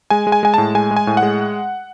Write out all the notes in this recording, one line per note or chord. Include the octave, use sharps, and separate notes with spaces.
G#3 G#5
G#3
G#5
G#3 G#5
A2 A5
G#3 G#5
G#3
G#5
A2
F#5
G#3